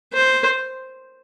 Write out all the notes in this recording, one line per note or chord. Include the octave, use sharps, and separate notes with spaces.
C5